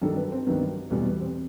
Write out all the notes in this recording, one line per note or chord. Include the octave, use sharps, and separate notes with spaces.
G2 D#3 F#3 A4
B4
C4
G2 D#3 F#3 B3
E2 B2 G3 A3
B3
C4